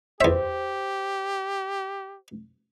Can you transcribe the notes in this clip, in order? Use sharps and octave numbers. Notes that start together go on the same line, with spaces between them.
E2 G4 C5 E5